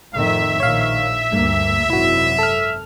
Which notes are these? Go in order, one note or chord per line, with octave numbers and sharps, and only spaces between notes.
F2 A2 D#3 E5
A#1 D#3 C#5 F5
D2 G2 A#3
G#1 F#2 C3 E4 F#4
A4 F6